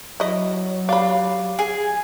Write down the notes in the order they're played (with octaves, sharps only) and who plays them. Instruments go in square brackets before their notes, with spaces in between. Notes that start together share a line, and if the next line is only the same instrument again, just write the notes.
[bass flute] F#3 [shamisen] E4 D#5
[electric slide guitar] G4 F5 [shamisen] D5 B5
[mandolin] G#4